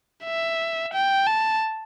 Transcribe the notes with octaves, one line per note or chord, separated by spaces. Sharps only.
E5
G5
A5